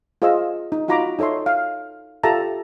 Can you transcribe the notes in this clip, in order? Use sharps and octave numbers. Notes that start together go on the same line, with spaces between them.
F4 G#4 C5 D#5 F5 E6
D#4
D#4 F4 F#4 A#5 B5 D6
D#4 A4 C#5 E5 C6
F5
F4 G4 A4 E5 A5 A#5